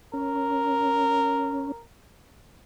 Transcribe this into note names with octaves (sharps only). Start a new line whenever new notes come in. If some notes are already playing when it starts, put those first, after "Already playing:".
C#4 A#4